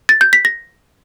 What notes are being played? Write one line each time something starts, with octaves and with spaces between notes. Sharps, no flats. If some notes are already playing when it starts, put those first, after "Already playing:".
A6
G6
B6
A#6